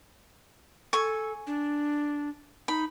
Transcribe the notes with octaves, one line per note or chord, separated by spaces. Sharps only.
A4 G#5 C#6
D4
D#4 B5